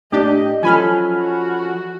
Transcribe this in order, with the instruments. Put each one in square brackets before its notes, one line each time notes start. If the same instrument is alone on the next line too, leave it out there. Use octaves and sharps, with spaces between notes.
[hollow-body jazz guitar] A2 [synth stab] D4 G4 [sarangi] D#5
[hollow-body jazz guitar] F3 C#4 A4 [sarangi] F#3 [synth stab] G#5 B5 F6
[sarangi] F#4